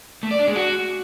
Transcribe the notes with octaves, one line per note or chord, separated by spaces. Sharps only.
A3
D5
D4
G#3
F#4